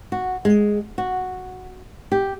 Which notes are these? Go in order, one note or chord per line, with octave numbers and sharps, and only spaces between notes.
F#4
G#3
F#4
G4